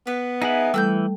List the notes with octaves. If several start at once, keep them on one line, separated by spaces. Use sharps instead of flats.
B3 B4
D#4 E4 G#4 F#5
E3 G3 A3 A4 E6 F#6 G6